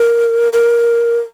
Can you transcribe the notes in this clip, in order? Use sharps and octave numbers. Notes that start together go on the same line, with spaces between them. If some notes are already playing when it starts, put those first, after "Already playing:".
Already playing: A#4
A#4